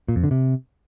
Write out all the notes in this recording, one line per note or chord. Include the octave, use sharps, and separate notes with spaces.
A#2
F2
D3
C3